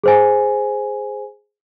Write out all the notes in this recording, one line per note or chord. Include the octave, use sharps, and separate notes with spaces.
G#4 C5 G#5